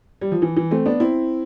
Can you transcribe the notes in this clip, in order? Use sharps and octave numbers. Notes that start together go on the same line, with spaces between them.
G3
F3
E3
E3
A3 C4
B3 D4
C4 E4